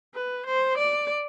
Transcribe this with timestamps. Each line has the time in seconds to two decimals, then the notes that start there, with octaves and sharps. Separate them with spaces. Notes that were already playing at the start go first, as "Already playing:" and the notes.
0.14 B4
0.46 C5
0.78 D5